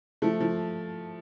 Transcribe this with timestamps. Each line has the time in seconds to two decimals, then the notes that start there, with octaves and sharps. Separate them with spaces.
0.22 F3 A3
0.40 F3